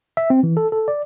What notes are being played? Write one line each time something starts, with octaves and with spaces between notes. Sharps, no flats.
E5
C4
E3
A4
A4
D5